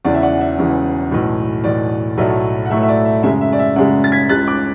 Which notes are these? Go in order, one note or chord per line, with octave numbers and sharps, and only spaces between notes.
E1 E2 C#3 E3 D5
E5
D5 F#5
E5
E1 E2 C#3 E3
B1 A2 E3
B1 A2 E3 D5
B1 A2 F#3 A3 D5
F#5
B1 A2 F#3 A3 E5
E5
D5
E5
F#2 C#3 G#3 E5
E5
D5
E5
F#2 C#3 G#3 D5 F#5
A6
G#6 B6
C#2 C#3 G#3 F#6 A6
D6 F#6